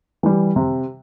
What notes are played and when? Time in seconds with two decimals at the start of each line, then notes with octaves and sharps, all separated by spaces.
0.23 E3 G3
0.56 C3